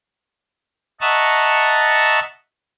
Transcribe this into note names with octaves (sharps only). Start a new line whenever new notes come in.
D#5 E5 F#5 A5 A#5 C#6